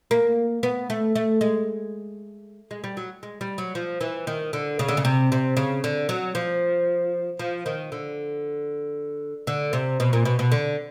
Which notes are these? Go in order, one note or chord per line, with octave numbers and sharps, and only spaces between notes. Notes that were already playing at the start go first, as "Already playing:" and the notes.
A#3
B3
A3
A3
G#3
G#3
G3
F#3
G#3
G3
F#3
F3
E3
D#3
D3
C#3
D3
C#3
C3
C3
C#3
D3
F#3
F3
F3
D#3
D3
D3
C3
B2
A#2
B2
B2
D3